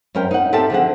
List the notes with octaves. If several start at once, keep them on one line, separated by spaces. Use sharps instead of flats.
F#2 C4 C#4 A#4 G5
D#4 F#5
C4 G4 A4 A#4 E5 A5
D3 F3 G#4 F#5